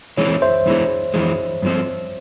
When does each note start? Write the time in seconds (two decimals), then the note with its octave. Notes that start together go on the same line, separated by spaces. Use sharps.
0.17 E3 G#3 C4 C#5
0.42 C5 E5
0.66 E2 E3 G#3
1.14 F2 E3 G#3
1.62 G2 F3 C4